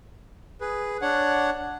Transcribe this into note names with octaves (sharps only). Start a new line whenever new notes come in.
G#4 B4
D4 C#5 F#5